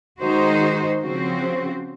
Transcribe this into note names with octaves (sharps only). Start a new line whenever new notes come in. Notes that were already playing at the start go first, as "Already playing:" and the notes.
D#3 G#3 D#4 F#4 C5
C#3 F3 C4 F#4 C5